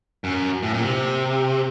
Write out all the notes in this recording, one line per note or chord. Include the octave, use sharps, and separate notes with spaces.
F#2
A2
A#2
C3